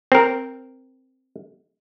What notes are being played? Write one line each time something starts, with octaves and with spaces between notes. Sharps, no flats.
C4 A#4